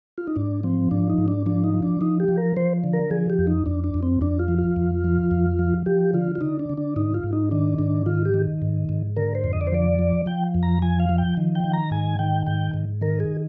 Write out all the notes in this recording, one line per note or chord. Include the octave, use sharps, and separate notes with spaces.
F4
D#4
G#2 D4
F3 C4
G#2 D4
D#4
G#2
D4
F3 D4
D#4
F3
D4
F3 D#4
G4
F3
A#4
F3 C5
D3
A#4
F3 G#4
G4
F2
D#4
F2 D4
D4
F2
C4
F2 D4
F4
F3
F4
F2
F3
F2
F3
F3 G4
D3 F4
F4
D3 D#4
D4
D3
D4
G#2 D#4
F4
G#2
D#4
D#3 D4
G#2 D4
D#3 F4
G4
D#3
G#2
G#2
D3 A#4
C5
F2
D#5
D5
C5
F3 D5
F3
F3 G5
F2
A#5
F3 G#5
F5
F3
G5
D#3
G5
D#3
A#5
G#2 G#5
D#3 G5
G#2 G5
G#2
D#3 A#4
G#4